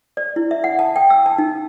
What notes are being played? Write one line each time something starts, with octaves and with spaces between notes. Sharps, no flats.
D5
E4
E5
F#5
A5
G5
E6
A5
D#4